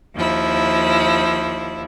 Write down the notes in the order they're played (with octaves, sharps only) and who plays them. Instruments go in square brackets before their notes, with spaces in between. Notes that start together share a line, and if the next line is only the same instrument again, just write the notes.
[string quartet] D#2 F3 E4